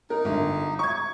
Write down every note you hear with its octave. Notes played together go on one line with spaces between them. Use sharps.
D#4 A#4
G1
C#6 G#6